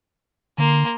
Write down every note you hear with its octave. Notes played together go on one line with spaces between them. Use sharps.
D3 A#3 C6